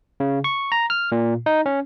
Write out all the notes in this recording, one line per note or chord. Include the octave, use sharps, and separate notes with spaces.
C#3
C#6
A#5
F6
A#2
D#4
C#4